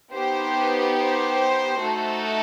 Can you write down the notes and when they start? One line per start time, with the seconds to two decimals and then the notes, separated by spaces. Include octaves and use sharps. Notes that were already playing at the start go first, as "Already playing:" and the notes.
0.13 B3 D#4 G4 C5
0.98 C5
1.81 A3 D#4 F#4 A4